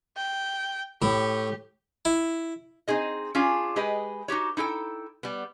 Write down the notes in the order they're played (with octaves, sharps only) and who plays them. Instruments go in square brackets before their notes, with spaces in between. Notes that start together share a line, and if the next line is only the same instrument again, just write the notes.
[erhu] G5
[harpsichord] A2 [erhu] G4
[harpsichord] E4
[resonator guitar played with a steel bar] C4 D#4 G#4 D#5
C#4 D4 F4 G4 G#4
G#3 G4 G#4 B4 D#5
D#4 F#4 G4 C#5
D#4 E4 A4 G5
G3 B3